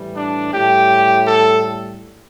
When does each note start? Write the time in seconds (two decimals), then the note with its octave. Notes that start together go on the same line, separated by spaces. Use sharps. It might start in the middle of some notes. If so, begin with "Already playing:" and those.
Already playing: A2 E3 G3
0.16 D4
0.53 A2 G3 G4
1.27 A4